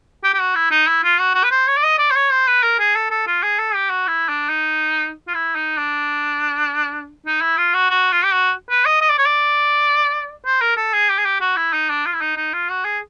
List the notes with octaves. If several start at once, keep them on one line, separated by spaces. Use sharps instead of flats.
G4
G4
F#4
E4
D#4
E4
F4
F#4
F#4
B4
C5
C#5
D5
D#5
D5
C5
C#5
C5
B4
A#4
G#4
A4
A4
F4
G#4
A4
G4
F#4
E4
D4
D#4
F4
E4
D#4
D4
D#4
E4
F4
F#4
F#4
F4
G4
F#4
B4
D#5
D#5
D5
C#5
D5
C5
A#4
A4
G#4
G4
G#4
G4
F#4
E4
D#4
D4
F4
E4
D#4
D#4
F4
F#4
G#4